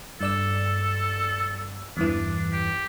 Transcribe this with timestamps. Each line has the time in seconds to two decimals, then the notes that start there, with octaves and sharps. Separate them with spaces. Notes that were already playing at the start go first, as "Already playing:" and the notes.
0.21 G2 A4 D5 E6
1.97 E2 G2 E3 D4
2.52 G4